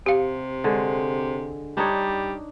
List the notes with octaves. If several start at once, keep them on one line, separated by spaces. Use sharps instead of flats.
C3 G4 F5
D3 G#3 C#5
G3 D4 D#4 C#5